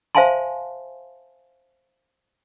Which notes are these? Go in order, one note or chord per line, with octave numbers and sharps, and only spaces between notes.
C5 E5 F5 G#5 A5 C6